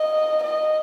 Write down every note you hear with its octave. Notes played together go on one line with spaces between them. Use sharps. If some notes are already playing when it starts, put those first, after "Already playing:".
Already playing: D#5
D#5